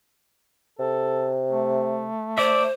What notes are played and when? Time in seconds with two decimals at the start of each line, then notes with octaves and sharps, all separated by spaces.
0.79 C3 A4
1.51 A3
2.38 C5 D5 E5